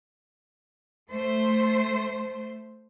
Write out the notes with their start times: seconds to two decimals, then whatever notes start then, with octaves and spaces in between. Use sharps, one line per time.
1.10 A3 C5